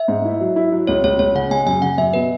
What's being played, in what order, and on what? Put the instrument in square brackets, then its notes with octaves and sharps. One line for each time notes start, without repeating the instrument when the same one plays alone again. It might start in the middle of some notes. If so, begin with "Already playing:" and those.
Already playing: [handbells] E5
[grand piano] G#2
E4
F#3
E4
F#3
[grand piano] C#2 [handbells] C#5
[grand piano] C#2 [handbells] C#5
[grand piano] C#2 [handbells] C#5
[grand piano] C#3 [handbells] F#5
[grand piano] G#3 [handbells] G#5
[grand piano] F#2 [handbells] G#5
[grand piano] C#3 [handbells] F#5
[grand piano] F#2 [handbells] E5
[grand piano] B2 [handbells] B4